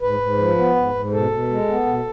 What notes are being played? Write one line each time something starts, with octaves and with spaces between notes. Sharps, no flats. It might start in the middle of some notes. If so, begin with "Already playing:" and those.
G#2 B4
G#2
F3
B3
G#2
G#2
B2 A4
B2
G#3
B3
B2